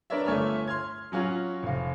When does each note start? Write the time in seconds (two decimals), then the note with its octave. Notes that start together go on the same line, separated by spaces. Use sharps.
0.10 D4 A#4 B4 C#5 D5 E5
0.26 G1 A3 C#5 E5 G#5 F6
0.67 C6 F6 G#6
1.12 F#3 C#4 F4 F#4
1.63 F1 F5